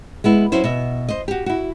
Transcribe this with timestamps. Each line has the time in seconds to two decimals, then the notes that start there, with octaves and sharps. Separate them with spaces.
0.24 G#3 B3 E4
0.52 F#3 C#4 E4 C5
0.64 B2 E5
1.09 C5 D#5
1.28 F#4 G4
1.46 E4 F#4